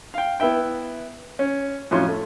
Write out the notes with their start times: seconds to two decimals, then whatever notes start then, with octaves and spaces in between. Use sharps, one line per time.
0.14 F5 G5
0.40 B3 E4 B4 E5 G5
1.39 C#4
1.91 F2 A2 F#3 C#4 F4 C6
2.08 A3